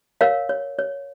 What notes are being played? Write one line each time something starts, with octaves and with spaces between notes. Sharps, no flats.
A#4 C#5 F5
C#5
C#5